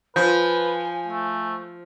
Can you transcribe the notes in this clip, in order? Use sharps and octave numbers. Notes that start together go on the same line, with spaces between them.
F3 F4 B4 G#5 G6
A3